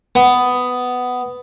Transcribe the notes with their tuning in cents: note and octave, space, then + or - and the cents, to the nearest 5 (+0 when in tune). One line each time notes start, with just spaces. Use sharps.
B3 +10